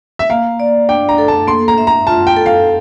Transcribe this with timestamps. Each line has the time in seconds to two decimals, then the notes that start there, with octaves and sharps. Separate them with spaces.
0.19 E5
0.30 A#3 F5
0.60 D5
0.89 D4 G5
1.09 A#5
1.18 A4
1.28 A5
1.48 A#3 C6
1.68 A#5
1.78 E5
1.87 A#5
2.07 F4 A5
2.27 G5
2.37 A4
2.46 F5